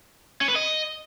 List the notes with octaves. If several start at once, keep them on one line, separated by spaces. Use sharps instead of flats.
C#4
B4
D#5